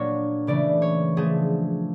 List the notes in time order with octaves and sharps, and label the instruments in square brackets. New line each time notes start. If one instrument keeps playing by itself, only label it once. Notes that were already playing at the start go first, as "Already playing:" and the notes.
Already playing: [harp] A#2 F#3 A#3 D4 C#5
C#3 E3 A3 D5
C#5
F3 A3 D4 G#4